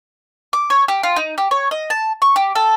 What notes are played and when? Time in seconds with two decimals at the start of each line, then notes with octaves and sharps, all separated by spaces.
0.53 D6
0.70 C#5
0.88 G4
1.03 F4
1.16 D#4
1.38 G4
1.51 C#5
1.71 D#5
1.90 A5
2.22 C#6
2.36 G4
2.55 A4